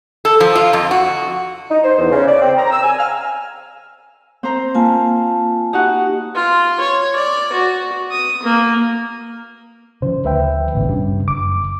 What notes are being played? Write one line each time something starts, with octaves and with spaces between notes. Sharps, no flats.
A4
F3
F4
F2
F#4
D#4
C5
E2
C#3
D5
C4
A#5
E6
G#5
F6
C4 C5 A#5
A#3 F4 G#5 A5
D#4 F#4 G4 F#5
F4
C#5
D5
F#4
D#6
A#3
C#3 F3 C5
D2 B4 E5 G5
A1 B2 D3
G2 C#3
F#1 D6